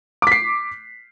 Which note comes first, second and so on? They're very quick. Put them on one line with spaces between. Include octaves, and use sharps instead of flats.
D6 B6 C7